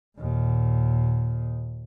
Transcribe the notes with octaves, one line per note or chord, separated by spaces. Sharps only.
D#2 A#2